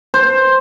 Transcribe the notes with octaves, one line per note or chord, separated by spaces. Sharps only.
C5